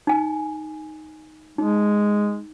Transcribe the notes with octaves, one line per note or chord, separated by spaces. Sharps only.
D#4 G#5
G#3 D#4